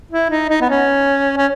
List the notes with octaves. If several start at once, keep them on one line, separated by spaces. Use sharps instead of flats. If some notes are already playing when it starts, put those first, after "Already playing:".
E4
D#4
D#4
B3
C#4
C#4